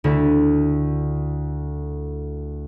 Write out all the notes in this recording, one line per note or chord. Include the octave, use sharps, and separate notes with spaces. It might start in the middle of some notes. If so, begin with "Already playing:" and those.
D2 D3 E4